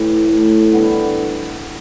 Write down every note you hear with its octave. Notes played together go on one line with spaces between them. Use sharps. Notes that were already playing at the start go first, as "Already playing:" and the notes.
Already playing: A2 E3 G4
A2 E3 A3
D3 G3 B3 E4